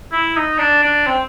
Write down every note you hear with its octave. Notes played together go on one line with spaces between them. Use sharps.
E4
D#4
D4
D4
C4